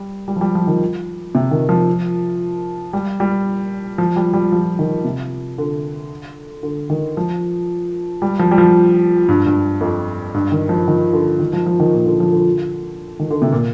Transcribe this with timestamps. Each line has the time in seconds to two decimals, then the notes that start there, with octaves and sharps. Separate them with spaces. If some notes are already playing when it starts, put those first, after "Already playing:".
Already playing: G3
0.28 G3
0.36 F3
0.41 G3
0.55 F3
0.67 D#3
1.35 C3
1.51 D#3
1.69 F3
2.93 G3
3.20 G3
3.98 F3
4.16 G3
4.34 G3
4.52 F3
4.79 D#3
5.05 C3
5.58 D3
6.63 D3
6.90 D#3
7.17 F3
8.22 G3
8.39 F3
8.51 G3
8.58 F3
9.28 G2
9.46 G2
9.81 F2
10.34 G2
10.52 D#3
10.69 F3
10.88 D#3
11.13 D3
11.39 D#3
11.53 F3
11.66 F3
11.80 D#3
11.93 A#2
12.06 D3
12.20 F3
12.32 D3
13.19 D#3
13.30 D3
13.42 C3
13.52 A#2